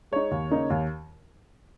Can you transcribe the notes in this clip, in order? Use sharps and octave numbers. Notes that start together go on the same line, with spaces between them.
G#3 D#4 C#5
D#2
C#3 A#3 D#4
D#2